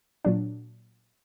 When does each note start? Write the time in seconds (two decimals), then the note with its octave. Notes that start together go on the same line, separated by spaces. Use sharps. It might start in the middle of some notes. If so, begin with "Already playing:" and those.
0.25 A#2 F#3 D4